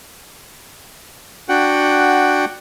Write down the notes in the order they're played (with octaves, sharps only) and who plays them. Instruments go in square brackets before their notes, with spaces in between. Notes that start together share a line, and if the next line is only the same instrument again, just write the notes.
[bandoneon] D4 F#4 F#5 G5